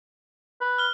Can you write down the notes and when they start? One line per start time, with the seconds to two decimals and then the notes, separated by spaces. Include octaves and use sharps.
0.61 B4
0.78 F6 G7